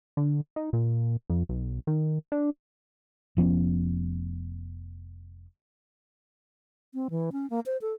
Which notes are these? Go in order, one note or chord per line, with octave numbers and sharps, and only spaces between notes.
D3
D#4
A#2
F2
B1
D#3
D4
F1 F3 B3 C#4
C4
E3
C#4
A#3
C5
A4